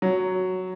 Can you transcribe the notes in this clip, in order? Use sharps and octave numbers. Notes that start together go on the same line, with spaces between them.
F#3